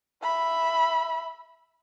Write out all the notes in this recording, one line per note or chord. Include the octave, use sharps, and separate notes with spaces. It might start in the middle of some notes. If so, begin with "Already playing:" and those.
E5 B5